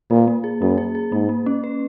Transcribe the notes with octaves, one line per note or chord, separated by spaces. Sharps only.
A#2 A#3
A#3
G#4
F#2 A#3
G#4
G#4
G#2 A#3
A#3
C#4
B4